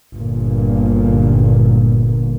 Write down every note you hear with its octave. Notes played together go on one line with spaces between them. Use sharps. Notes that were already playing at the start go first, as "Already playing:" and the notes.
G1 A#2